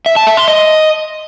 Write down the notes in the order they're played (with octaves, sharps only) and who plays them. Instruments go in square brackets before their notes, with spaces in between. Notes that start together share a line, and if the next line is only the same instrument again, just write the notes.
[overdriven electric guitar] E5
A5
E5
C6
D#5